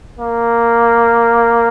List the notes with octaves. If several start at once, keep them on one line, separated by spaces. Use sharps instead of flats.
A#3